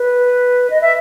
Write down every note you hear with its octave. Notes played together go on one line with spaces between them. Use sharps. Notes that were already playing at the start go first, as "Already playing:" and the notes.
Already playing: B4
D#5
E5